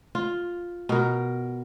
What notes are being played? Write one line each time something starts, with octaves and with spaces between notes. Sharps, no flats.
F4
B2 A#4